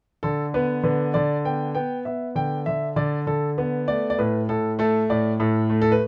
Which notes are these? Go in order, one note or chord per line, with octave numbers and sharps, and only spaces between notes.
D3 A4
B3 B4
D3 B4
D3 D5
B3 G5
B3 G5
B3 E5
D3 G5
D3 E5
D3 D5
D3 A4
B3 B4
A3 D5
D5
A2 B4
A2 A4
A3 A4
A2 D5
A2 A4
A3
A4
B4